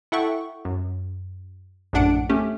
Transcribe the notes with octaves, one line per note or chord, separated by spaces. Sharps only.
E4 A4 E5 F#5 G5 C#6
F#2
A#1 F#2 A2 D4 F#5 D7
A3 C#4 G4